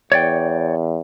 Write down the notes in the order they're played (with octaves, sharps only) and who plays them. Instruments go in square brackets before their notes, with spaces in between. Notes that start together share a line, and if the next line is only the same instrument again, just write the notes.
[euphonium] E2 [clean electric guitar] C#5 D5 G5